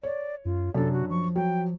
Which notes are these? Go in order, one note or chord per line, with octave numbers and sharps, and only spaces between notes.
C#5 D5
F#2 F4
F#2 C3 D4 A4
F#4
F3 C#6
F#3 G5